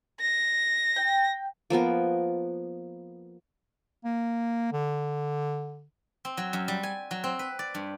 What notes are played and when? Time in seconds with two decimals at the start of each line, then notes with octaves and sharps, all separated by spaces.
0.20 A#6
0.96 G5
1.70 F3 A#3 B3 A#4
4.05 A#3
4.72 D3
6.25 C4
6.37 F#3
6.53 F#2
6.68 G3
6.83 G#5
7.11 F#3
7.24 C4
7.39 B4
7.59 D5
7.75 G2